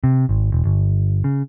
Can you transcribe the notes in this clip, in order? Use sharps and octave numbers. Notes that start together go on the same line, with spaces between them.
C3
G#1
E1
G1
C#3